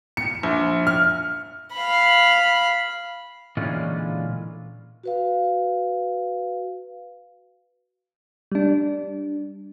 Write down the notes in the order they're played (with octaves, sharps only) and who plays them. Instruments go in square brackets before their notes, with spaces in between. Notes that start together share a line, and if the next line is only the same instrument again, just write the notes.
[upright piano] C#7
A#1
F6
[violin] F5 B5
[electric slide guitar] A#2 D3 E3 G#3 C#4 F4
[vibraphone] F#4 B4 F5
[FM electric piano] G3 D4